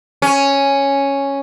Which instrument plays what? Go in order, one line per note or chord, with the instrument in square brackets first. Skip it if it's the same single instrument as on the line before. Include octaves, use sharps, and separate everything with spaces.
[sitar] C#4